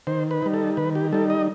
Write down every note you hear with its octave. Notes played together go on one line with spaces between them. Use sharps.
D#3 C5
B4
G3 D#4
A4
D#3 B4
G4
G3 D#4 A4
D#5